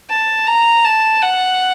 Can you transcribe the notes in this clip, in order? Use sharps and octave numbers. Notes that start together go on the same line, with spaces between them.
A5
A#5
A5
F#5